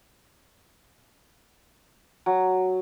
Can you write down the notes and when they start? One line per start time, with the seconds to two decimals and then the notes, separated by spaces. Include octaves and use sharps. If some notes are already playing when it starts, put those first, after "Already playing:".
2.26 F#3